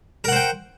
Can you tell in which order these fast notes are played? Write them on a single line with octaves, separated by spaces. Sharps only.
A#4 F#5 C5 G5